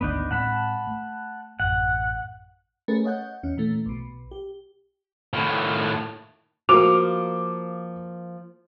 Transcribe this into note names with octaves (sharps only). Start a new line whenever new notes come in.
G#1 D2 B3 D4 D#4
A2 G#3 C4 F#5 A5 B5
A3
A1 F#2 F#5
A3 C#4 G#4 A#4 B4
C#5 D#5 F#5 G6
E2 C#4
A#2 E3 A3
B1 B2
G4
A2 D#3
F3 A#3 F#4 D6